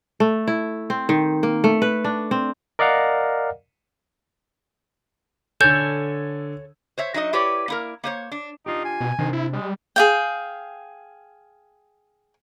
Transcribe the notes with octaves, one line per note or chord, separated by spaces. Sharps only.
A3
E4
C4
D#3
A#3
A3
B4
D4
C4
A#4 D5 D#5 F5 F#5 A#5
D3 A4 C#5 G#5 G6 G#6
C5 C#5 E5
F#3 D#4 D5 D#5
E4 G4 B4 C#5 D5
A#3 E4 A#4
A#3 C5 C#5
D4
D4 D#4 F4 G4
G#5
B2
C3 D#3 D4 C5
E4
G3 G#3
G#4 F5 G5